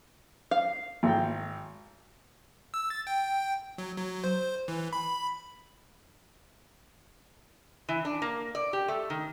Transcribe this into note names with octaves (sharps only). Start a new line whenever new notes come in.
F5
G#1 G5
E6
A6
G5
F#3
F#3
C5
E3
B5
E3
D4
A#3
D5
G4
A3
D#3